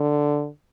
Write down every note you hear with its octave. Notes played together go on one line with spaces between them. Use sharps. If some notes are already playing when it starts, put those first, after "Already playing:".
Already playing: D3